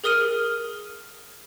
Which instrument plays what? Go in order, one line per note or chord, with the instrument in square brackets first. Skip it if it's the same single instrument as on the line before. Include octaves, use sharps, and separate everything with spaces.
[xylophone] G#4 A#4 D#6 F6 D#7